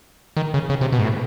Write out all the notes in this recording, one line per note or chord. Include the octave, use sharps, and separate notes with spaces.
D#3
C#3
C#3
C3
B2
G#2
A2